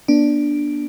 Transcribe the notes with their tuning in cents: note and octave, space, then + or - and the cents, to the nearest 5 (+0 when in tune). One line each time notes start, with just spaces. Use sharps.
B3 -40 D4 +0